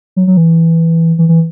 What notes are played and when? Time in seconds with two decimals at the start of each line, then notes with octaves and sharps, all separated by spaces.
0.16 F#3
0.27 F#3
0.37 E3
1.18 E3
1.29 E3